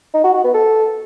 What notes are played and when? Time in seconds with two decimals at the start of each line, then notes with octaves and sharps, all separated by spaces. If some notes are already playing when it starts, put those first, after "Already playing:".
0.14 D#4
0.24 F#4
0.34 F#4
0.44 B3
0.54 A4